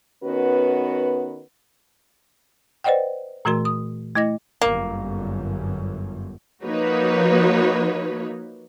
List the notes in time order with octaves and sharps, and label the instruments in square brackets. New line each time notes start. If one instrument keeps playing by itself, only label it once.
[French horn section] D#3 B3 C#4 F#4 B4
[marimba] B4 C5 D5 D#5 F#5 G5
A#2 E3 A3 F#4 A#4 C6
D#6
A3 E4 D#5 A#6
[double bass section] G1 F#2 [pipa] A#3
[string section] F3 A#3 D#4 F#4 B4 C#5